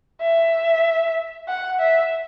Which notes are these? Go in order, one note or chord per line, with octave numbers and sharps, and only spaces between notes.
E5
F#5
E5